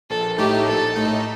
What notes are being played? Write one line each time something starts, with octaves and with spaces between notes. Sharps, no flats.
A#1 A4
A2 A3 D#4 G4
A#1 A4
A2 A3 D#4